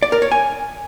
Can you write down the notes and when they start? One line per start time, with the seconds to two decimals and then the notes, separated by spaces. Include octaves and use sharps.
0.03 D5
0.12 A#4
0.22 C#5
0.32 G#5